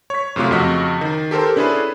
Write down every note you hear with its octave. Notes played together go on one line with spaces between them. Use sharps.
C#5 B6
F#2 C3 A3 F4 D6
F2 C#3 F#4 D#5 B6
D#3
G4 A4 A#4 C5
C#4 D4 E4 G#4 A4 B4